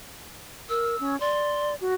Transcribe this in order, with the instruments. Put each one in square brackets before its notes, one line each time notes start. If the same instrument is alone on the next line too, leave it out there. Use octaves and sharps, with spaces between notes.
[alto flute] A#4 [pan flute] E6
[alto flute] C#4
[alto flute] D5 [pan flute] C6
[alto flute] F#4